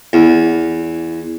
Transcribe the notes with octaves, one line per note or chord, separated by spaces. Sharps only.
E2